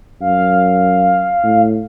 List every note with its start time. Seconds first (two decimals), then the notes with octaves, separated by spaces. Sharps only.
0.21 F#2 F5
1.44 A2